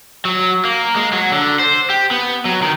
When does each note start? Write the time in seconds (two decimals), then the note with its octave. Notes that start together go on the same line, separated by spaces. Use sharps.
0.25 F#3
0.65 A#3
0.96 G#3
1.13 F#3
1.32 D3
1.59 C5
1.90 G4
2.11 B3
2.45 F#3
2.62 D#3